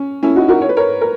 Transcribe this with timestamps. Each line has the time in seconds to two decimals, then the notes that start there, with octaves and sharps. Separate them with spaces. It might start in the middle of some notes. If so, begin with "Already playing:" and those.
Already playing: C#4
0.23 C#4 E4
0.36 D#4 F#4
0.48 F#4 A#4
0.61 C#5
0.69 B4
0.77 A#4 C#5
1.01 A#4